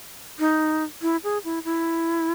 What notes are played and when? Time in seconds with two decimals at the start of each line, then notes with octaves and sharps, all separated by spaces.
0.39 D#4
1.02 E4
1.24 G#4
1.45 E4
1.65 E4